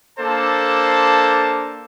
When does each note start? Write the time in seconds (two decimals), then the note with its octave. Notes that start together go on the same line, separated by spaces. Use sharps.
0.18 A#3 D4 A4 C5 A5